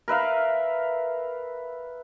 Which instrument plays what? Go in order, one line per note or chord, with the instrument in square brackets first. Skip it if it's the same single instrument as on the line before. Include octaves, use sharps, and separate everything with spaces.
[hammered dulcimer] A#4 B4 E5 F5